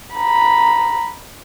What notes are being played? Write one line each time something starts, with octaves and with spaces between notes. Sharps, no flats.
A#5 B5